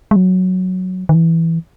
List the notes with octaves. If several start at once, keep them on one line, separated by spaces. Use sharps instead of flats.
G#3
F#3
D#3
E3